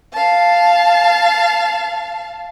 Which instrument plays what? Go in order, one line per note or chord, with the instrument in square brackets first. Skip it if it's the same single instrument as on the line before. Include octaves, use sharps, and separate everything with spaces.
[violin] F5 A5